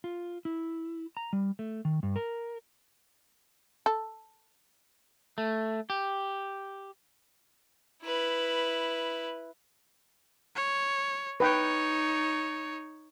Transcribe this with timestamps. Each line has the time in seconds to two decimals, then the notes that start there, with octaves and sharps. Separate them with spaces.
0.04 F4
0.45 E4
1.17 A#5
1.33 G3
1.59 A3
1.85 D#3
2.03 G2
2.16 A#4
3.86 A4
5.38 A3
5.90 G4
8.04 E4 B4
10.56 C#5
11.40 D#4 B4 C#5 G5